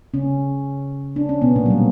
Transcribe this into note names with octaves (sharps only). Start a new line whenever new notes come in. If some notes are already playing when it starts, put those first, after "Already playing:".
C#3 C#4
D4
C#4
B2 B3
A#2 A#3
F#3
G3